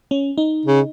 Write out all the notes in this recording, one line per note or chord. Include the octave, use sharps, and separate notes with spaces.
C#4
D#4
C#3